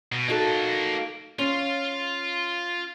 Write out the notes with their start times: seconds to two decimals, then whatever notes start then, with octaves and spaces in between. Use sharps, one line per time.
0.12 B2
0.28 A#3 D#4 F#4 A4 A5
1.39 C#4 F4